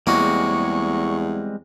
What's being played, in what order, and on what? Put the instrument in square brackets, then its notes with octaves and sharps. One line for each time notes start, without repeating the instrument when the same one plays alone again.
[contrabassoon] E2 [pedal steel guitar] G3 G#3 C4 [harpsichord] A#3 C#4 F#4 [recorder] C#6